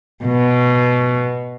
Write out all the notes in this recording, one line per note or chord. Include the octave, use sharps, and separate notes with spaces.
B2